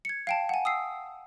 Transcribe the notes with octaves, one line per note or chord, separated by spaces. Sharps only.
G#6 C#7
F5 G5 A5
F#5 G#5
D#6 E6 C7